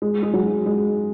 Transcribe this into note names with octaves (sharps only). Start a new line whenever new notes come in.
G#3
G#3
F#3
G#3